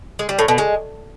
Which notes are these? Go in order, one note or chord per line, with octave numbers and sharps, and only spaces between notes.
G#3
G3
A2
B2
G#3